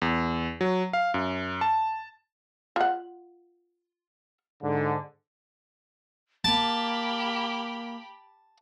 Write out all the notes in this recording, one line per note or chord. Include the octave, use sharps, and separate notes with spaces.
E2
F#3
F5
F#2
A5
F4 F#5
G#2 D3
A#3 G4 A5 B5